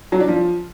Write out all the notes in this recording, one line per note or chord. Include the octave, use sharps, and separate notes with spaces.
F#3
D4
F3